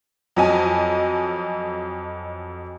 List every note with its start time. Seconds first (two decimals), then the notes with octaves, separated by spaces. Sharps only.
0.36 F2 F#3 D#5 G#5 A5